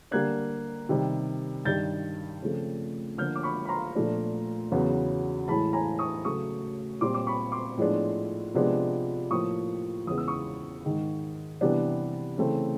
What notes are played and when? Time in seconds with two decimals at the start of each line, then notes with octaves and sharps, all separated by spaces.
0.11 D3 G3 A#3 D4 F#6 G#6
0.89 C3 D#3 G3
1.65 G2 D#3 G3 G6 A6
2.42 C#3 F3 A3 C4
3.18 D3 F3 A#3 D4 F6 G6
3.35 D6
3.43 B5 C#6
3.65 B5
3.69 A#5 C6
3.95 A#2 F3 A3 D4
4.72 E2 C#3 F#3 B3
5.48 A2 E3 G#3 A5 B5
5.73 G#5 A#5
5.99 C#6 D#6
6.25 C#3 F#3 A3 C#6 D#6
7.01 A#2 G3 C4 C6 D6
7.14 D6
7.27 B5 C#6
7.52 C6 D6
7.77 A2 F3 G#3 B3 D4
8.54 C3 F3 G#3 B3 D4
9.30 A2 F3 A#3 C#6 D#6
10.07 E2 C#3 E3 G#3 B3 D#6
10.18 E6
10.28 C#6 D#6
10.84 G#2 D#3 G#3
11.61 C3 E3 G3 B3 D4
12.38 C#3 E3 A3 C4